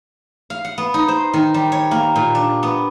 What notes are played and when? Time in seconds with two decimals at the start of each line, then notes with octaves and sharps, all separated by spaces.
0.50 F5
0.65 F#5
0.78 B3
0.94 D#4
1.08 C5
1.34 D#3
1.54 G3
1.72 C#5
1.91 A#3
2.16 A#2
2.35 D4
2.63 B3